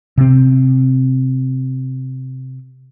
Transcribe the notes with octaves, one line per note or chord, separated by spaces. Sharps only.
C3 C4